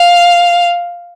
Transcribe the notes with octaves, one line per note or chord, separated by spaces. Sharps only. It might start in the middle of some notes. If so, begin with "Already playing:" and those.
Already playing: F5